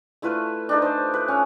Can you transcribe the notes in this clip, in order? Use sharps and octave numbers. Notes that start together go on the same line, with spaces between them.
A3 E4 F4 B4
D4 D#4 A4
C5
B4
C#4